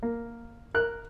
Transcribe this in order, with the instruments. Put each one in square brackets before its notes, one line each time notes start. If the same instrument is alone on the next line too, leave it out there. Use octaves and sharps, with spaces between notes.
[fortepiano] A#3
A#4 F#6